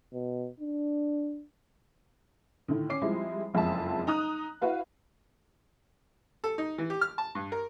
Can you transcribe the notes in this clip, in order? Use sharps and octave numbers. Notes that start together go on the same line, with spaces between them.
B2
D4
A2 D3 D#3
C#4 D6 C7
F3 G3 G#3 C4 E4
F#1 F2 G#3 E5 A5
D#4 A#5 D#6 F#6
E4 F#4 B4 F5
A4
D#4
E3
G4
F6
A5
G2
A#4